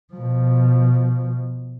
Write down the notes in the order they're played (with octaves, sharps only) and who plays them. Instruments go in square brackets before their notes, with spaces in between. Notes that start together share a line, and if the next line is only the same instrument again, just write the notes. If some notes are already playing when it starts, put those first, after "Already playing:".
[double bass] B2 F3